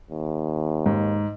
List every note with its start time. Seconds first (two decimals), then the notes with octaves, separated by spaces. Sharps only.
0.11 D#2
0.86 G#2